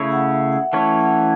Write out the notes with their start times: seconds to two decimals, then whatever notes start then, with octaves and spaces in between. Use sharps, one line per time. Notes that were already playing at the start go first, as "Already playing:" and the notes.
Already playing: C#3 A3 E4 C#5 E5
0.12 F#5
0.33 E5
0.52 F#5
0.72 E3 A3 C#4 E4 C#5 A5
1.00 F#5